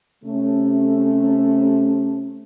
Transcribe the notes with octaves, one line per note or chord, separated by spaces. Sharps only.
C3 A3 C#4